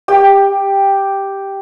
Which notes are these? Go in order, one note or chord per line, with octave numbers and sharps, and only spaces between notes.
G4 G5